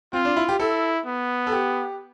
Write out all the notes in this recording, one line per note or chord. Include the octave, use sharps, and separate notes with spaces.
C4 F4
D4
E4
G4
E4 A4
B3
A4
G4